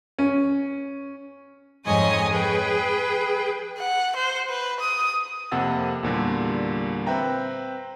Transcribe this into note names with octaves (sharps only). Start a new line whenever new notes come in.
C#4
F2 G#2 C#5 D#5 G#5 D#6
G#4 B4 G5
F#5
C5
B4
D#6
F2 C3 A#3 F#5 E6 A6
E2 A#2 D3 G3
C4 B4 E5 G5 A#5